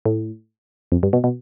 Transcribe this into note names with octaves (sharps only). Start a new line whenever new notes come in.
A2
F2
G2
B2
B2